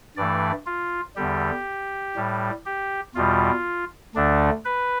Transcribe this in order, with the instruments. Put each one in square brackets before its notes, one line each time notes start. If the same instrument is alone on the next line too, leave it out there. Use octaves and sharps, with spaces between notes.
[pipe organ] G2 E3 A3 D5
F4
E2 D3 G3 G4
A2 G3
G4
E2 B2 G3 F4
D2 D3 A3 D4
B4